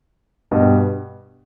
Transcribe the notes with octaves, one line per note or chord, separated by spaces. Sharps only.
G2 B2